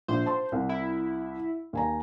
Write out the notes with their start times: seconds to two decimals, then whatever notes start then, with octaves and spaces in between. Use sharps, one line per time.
0.08 A#1 C5
0.26 A5 C6
0.52 C2
0.69 E4
1.73 D#2 G#5 A#5